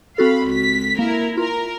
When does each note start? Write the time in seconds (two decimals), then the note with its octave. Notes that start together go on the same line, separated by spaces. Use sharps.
0.18 C4 F#4 A4 F5 B5
0.48 C#2 B6
0.99 A#3 E4 A#4
1.37 F4 A#4